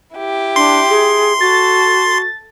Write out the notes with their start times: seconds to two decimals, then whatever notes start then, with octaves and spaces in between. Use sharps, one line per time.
0.15 E4 G4
0.56 D4 C6
0.90 G#4
1.41 F#4 A4 A6